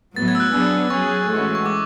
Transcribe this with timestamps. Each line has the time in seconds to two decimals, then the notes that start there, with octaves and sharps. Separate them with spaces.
0.16 A2 F#3 B3 A6
0.28 G#6
0.35 E6
0.40 F#6
0.52 F#3 B3 D4 G#4 E6
0.90 F#3 C#4 G#4 C#6
1.28 A2 E3 G#3 C#4 F#4
1.55 C#6
1.66 D6